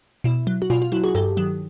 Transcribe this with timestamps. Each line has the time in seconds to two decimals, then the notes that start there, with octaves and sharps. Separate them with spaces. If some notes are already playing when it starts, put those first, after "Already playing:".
0.24 B2 E4
0.47 F#3
0.62 F#4
0.70 B2 F4
0.82 F4
0.92 F#3 E4 F#4
1.04 F#4 G#4
1.15 G2 G4 A4
1.37 D#3 F#3